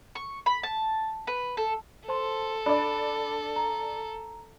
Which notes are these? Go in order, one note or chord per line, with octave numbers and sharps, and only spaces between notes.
C#6
B5
A5
B4
A4
A4 C5 A5 C6
D4 D5 B5
A#5